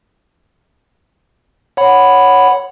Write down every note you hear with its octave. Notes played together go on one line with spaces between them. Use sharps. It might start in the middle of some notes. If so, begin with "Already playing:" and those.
C#5 F#5 B5